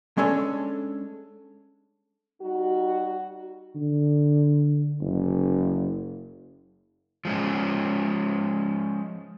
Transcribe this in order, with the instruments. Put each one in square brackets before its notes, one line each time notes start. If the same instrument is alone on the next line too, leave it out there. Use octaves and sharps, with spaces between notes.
[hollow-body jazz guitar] G#3 C#4 D4 A4 C#5
[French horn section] G3 D#4 F#4
[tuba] D3
F#1
[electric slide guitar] F3 G#3 C#4